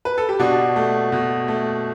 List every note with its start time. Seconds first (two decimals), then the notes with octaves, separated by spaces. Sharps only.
0.05 B4
0.18 A4
0.29 G4
0.39 B2 D4 F#4
0.76 A3
1.12 B2
1.48 A3